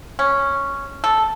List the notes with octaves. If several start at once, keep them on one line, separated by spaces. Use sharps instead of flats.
C#4
A4